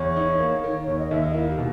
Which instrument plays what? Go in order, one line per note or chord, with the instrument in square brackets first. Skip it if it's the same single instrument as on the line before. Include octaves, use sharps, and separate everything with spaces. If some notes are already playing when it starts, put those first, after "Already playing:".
Already playing: [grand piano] E2 [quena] C#5
[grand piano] D#4
A#3
D#3
[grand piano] D#2 [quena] C#5
[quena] D#5
[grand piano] D#2 [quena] E5
[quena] D#5
[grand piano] A#3 [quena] E4
[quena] G4
[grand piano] B2